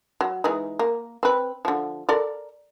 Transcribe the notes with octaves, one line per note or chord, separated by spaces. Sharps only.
F#3
E3 G#3 D#4
A#3
C4 B4
D3 F3
A4 A#4 D5